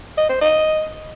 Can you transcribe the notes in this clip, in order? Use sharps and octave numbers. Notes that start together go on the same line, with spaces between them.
D#5
C5
D#5